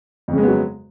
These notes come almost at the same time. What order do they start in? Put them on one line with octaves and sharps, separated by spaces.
F2 C#3 G#3 B3 F#3